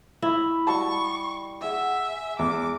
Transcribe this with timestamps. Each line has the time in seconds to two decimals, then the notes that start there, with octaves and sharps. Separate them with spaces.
0.22 E4 D#5 B5 C#6
0.67 G3 F#4 A5 C#6
1.61 G#4 E5 F#5 G#5
2.39 E2 E5 D6